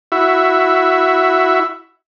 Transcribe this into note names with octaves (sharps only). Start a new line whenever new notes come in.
E4 F#4 E5